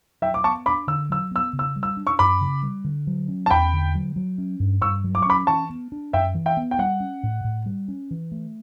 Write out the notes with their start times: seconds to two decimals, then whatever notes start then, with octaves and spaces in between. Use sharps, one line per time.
0.22 F#3 E5 G5
0.34 D6
0.44 B3 A5 C#6
0.66 D4 B5 D6
0.87 D3 E6
1.10 F#3 E6
1.31 B3 E6
1.53 C#3
1.59 E6
1.76 G3
1.83 E6
1.97 D4
2.07 C#6 E6
2.19 F#2 B5 D6
2.41 C#3
2.63 G3
2.84 D3
3.07 F#3
3.28 C#4
3.46 A5
3.51 E2 G5 B5
3.73 D3
3.95 F#3
4.16 F#3
4.38 C#4
4.60 G2
4.82 G2 C#6 E6
5.04 F#3
5.15 D6
5.22 C#6
5.26 C#4 B5 D6
5.47 E3 A5 C#6
5.70 B3
5.92 D4
6.13 F#2 E5 G5
6.35 E3
6.46 E5 G5
6.57 B3
6.71 G5
6.79 G3 F#5
7.00 C#4
7.23 A2
7.44 A2
7.66 G3
7.88 C#4
8.11 E3
8.32 A3